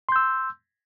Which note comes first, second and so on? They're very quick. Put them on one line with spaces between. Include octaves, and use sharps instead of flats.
C6 G6 E6